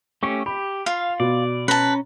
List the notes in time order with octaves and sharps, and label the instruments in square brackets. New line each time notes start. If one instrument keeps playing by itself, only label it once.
[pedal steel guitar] A3 C#4 G4 [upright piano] C#6
[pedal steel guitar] G4 [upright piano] B5
[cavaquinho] F4 [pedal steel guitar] F5
[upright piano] B2 [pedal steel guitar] D5
[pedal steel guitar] C#4 A#5 [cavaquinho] B4 A5